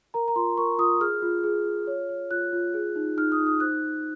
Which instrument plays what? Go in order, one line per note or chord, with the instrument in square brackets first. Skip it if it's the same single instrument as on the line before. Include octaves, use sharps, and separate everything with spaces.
[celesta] A#4 A#5
A#5
F4 C6
A#4 C#6
F4 D#6
G#4 F6
F4
G#4
F4
C#5
C#5
F4 F#6
F4
G#4
D#4
D#4 F6
D#6
D#4
D#6
C5 F#6